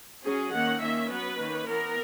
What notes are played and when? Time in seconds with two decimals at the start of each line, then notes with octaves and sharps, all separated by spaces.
0.24 F#3 C#4 G#4
0.53 D#3 A#3 C#4 F#5
0.81 D#3 A#3 C#4 E5
1.10 F#3 B3 B4
1.38 D#3 A#3 C#4
1.66 E3 B3 A#4